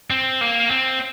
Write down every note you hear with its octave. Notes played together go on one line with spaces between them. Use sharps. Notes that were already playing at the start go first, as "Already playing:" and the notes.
C4
A#3
C4